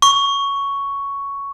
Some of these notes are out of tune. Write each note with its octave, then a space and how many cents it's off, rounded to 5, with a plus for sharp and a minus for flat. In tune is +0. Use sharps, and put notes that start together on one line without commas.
C#6 +5